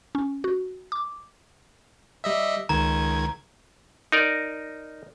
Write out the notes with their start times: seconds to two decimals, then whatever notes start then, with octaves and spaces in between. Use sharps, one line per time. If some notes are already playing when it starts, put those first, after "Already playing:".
0.15 C#4
0.44 F#4
0.92 D6
2.24 G3 D#5 E5
2.69 C#2 D#3 A#5 G#6
4.12 D#4 A#4 D5